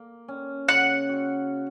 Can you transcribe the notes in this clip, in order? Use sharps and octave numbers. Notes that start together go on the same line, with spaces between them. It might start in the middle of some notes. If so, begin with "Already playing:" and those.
Already playing: A#3
C#4
C#3 F#5
F#4